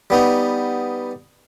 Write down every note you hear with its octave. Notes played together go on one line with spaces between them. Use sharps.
G3 B3 D#4